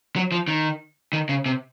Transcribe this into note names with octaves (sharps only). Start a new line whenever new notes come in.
F#3
F3
D#3
D#3
C#3
C3